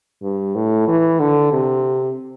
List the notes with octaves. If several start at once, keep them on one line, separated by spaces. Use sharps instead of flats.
G2
A2
E3
D3
C3